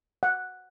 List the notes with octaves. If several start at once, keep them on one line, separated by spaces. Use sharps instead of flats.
F#5